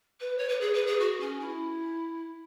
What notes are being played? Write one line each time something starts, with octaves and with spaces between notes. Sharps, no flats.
B4
C#5
B4
G#4
B4
G#4
F#4
C#4
E4